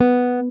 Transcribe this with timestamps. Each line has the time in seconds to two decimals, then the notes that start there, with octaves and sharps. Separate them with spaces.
0.01 B3